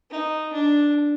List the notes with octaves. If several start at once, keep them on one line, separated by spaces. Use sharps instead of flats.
D#4
D4